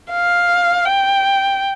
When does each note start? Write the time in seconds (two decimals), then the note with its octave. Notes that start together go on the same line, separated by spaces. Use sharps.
0.12 F5
0.85 G5